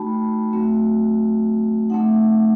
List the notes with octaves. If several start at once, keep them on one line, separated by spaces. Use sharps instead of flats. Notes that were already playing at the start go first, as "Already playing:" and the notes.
Already playing: A3 D#4 F#4 G5 A5 B5
F#3 A3 C4 F#4
A3 C4 D#4 F#5